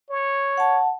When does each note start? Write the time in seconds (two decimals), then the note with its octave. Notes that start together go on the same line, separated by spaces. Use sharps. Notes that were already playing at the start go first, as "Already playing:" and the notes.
0.10 C#5
0.58 F#5 A5